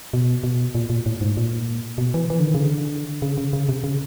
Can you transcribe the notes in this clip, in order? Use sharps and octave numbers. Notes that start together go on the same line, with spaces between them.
B2
B2
A#2
A#2
A2
G#2
A#2
B2
E3
E3
D3
D#3
C#3
D3
C#3
C#3
C#3
C3
C#3